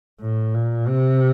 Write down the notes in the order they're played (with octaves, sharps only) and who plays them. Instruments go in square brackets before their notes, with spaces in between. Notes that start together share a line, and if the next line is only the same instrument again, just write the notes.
[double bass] A2
A#2
C3